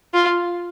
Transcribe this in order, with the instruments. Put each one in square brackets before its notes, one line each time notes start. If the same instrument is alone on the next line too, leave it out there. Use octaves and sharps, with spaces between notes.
[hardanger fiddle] F4